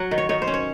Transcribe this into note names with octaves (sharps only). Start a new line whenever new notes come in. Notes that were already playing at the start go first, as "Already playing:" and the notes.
Already playing: F#3 F#5
D#3
C#5
D#3 C#5
C5
C#4
C#5